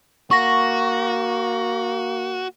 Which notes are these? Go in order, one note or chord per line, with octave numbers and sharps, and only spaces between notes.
A#3 F#4 C#6 A#6